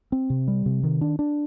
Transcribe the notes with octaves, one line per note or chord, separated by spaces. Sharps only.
C4
C3
G3
C3
D#3
D4
D4